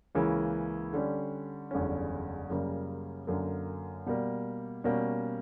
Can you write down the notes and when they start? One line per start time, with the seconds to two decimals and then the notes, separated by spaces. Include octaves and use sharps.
0.15 C#2 C#3 E3 A#3 C#4
0.93 D3 G3 C#4
1.71 F#1 E2 D3 G3 C#4
2.50 F#2 C#3 G3 A#3
3.27 F#2 D3 A#3
4.06 B2 G3 A#3
4.84 B2 G3 A#3 C#4